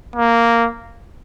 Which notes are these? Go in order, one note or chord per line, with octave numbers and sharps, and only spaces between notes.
A#3